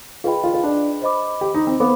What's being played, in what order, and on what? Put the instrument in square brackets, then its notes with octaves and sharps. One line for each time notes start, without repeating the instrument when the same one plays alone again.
[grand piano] F4 [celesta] G#4 B4 D#5 G5 B5
[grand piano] F4
F4
D4
[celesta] C5 D#5 B5 D6
[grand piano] G4
D#4
C4
[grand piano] B3 [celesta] C5 F5 B5 D6